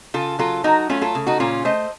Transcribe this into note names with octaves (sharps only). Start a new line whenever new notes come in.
C#3 F4 A4
F#3 F4 A4
F#3 D#4 F#4
A3 C#4 F4
F4 A4
C#3
D#4 F#4
A#2 C#4 F4
A3 C5 D#5